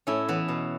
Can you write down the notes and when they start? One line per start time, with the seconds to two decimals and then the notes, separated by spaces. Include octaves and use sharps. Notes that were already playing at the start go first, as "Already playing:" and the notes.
0.07 A2 C#4 E4
0.29 E3 B3
0.48 B2